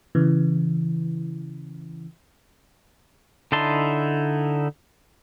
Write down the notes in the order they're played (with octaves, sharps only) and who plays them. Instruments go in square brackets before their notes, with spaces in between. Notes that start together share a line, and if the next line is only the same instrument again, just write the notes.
[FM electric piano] C#3 E3
[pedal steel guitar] D3 D#4 E4 A5 C6